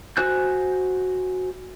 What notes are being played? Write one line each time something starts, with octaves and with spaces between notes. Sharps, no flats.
F#4 C5 G#5 F#6 G6